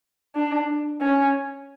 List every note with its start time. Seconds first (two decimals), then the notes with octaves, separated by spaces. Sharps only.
0.35 D4
1.01 C#4